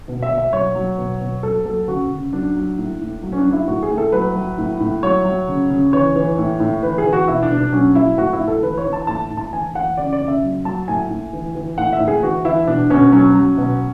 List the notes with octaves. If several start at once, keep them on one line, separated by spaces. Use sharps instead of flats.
B2
E5
B2
E5
F#3 C#5
F#3
B2
B2
F#3 A4
F#3 A4
C#3 F#4
C#3
F#3 D4
F#3
A2
A2
F#3
C#4
D4
F#3
E4
A2 F#4
G#4
A2
A4
F#3 B4
F#3
A2
A2
F#3 C#5
F#3
C#3
C#3
E3 C#5
E3
A2
A2
E3 B4
G#4
E3
F#4
B2 E4
D4
B2
D4
F#3 C#4
F#3 E4
A2 F#4
E4
A2
A4
E3 B4
C#5
E3
A5
A2 A5
A2
A5
E3 G#5
E3 F#5
C#3 D5
D5
C#3
E5
F#3
F#3 A5
A2 G#5
A2
E3
E3
A2 F#5
E5
A2
G#4
E3 F#4
E3 E4
B2 D4
B2 C#4
F#3 C#4
F#3
B2